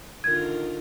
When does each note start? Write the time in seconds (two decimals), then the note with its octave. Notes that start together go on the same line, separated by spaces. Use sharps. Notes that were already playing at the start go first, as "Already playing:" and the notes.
0.24 D3 D#3 F4 A#4 G#6